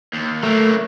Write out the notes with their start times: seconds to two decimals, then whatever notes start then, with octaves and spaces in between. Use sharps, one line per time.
0.13 D#2
0.43 F#3 A3 A#3